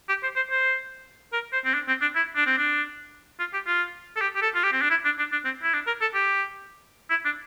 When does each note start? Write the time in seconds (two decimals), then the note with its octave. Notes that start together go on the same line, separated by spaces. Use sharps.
0.08 G4
0.23 C5
0.36 C5
0.51 C5
1.33 A#4
1.53 C5
1.65 C4
1.74 D4
1.88 C4
2.01 D4
2.16 E4
2.36 D4
2.46 C4
2.57 D4
3.39 F4
3.54 G4
3.66 F4
4.16 A4
4.21 G4
4.36 G4
4.42 A4
4.55 F4
4.64 G4
4.72 C4
4.81 D4
4.90 E4
5.05 D4
5.19 D4
5.32 D4
5.45 C4
5.63 E4
5.74 D4
5.87 A#4
6.01 A4
6.14 G4
7.10 E4
7.25 D4